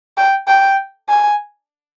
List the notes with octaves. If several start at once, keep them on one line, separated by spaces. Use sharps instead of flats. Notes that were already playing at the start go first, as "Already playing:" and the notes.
G5
G5
G#5